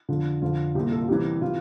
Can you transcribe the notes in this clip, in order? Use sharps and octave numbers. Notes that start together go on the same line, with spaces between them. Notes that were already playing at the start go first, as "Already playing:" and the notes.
F2 D3 F4
F2 D3 F4
C2 A#2 G4
A4
F4
C2 C3 E3 G4
C3 E3 F4